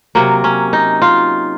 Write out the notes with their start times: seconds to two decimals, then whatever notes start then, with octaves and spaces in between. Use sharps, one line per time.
0.15 C3 F#3 A#3
0.44 C#4
0.73 D#4
1.02 F4